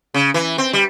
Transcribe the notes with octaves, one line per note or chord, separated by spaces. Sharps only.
C#3
E3
C4
G3